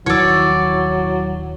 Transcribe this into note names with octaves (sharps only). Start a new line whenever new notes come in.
D#1 D#3 F3 F#3 E4 C#5 D5 E6